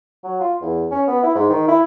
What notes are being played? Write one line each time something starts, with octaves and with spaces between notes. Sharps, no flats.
F#3
F4
E2
C#4
B3
E4
G#2
D#3
E4